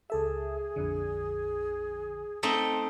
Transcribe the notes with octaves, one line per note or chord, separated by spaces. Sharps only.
C#2 G#4 A4 E5
A#1 F2 D3
A3 C4 D#4